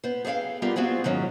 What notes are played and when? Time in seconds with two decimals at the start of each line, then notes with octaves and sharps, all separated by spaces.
0.04 B3 C5
0.25 G#4 A4 C#5 F5 G5
0.62 G3 B3 F4 G4 A#4
0.76 B3 C4 F4 F#4 G#4
1.04 G#2 D#3 F#3 C#4